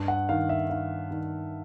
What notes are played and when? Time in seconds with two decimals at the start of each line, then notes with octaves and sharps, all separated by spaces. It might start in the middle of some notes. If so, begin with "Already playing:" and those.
Already playing: G2
0.08 F#5
0.29 D#3 F5
0.49 E5
0.70 D#3 F5
1.11 D#3